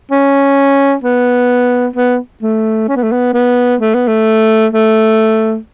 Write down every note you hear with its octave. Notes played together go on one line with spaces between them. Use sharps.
C#4
B3
B3
A3
C#4
B3
A3
B3
B3
A3
B3
A3
A3